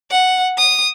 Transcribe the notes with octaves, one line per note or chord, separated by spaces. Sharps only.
F#5
D#6